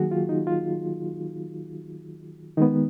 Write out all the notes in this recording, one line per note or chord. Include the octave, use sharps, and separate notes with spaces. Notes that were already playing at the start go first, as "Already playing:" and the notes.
Already playing: D#3 F#3 A#3 F#4 G#4
F4
D#4
F4
D#3 G#3 B3 D#4